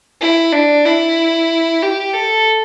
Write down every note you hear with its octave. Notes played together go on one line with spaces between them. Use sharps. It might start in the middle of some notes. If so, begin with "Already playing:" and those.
E4
D4
E4
G4
A4